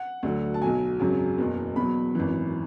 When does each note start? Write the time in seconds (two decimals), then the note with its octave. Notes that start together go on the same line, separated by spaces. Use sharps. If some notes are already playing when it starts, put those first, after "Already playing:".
Already playing: F#5
0.23 D2 D3 F#3
0.54 A5
0.61 B1 B2 F#3 G#5
1.00 G#1 F#2 C#3 F#3
1.38 F#1 E2 B2
1.76 E2 B2 F#3 B5
2.15 G#1 F#2 E3